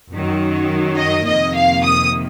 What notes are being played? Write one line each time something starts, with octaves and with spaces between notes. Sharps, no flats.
F#2 D#3 F#3
D#5
F2 C3 D#3 A#3 D#5
F5
D#6